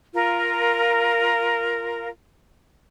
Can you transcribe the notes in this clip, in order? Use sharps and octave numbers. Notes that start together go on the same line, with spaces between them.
F4 A#4